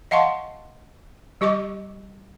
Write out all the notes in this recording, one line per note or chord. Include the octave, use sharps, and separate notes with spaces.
D#5 F5 F#5 A5 C6 C#6
G3 G4 D#5 C#6 D6